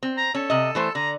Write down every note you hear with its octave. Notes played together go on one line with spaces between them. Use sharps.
C4
A#5
C#4 A4
C3 D#5
E3 A3 C5
D3 A#5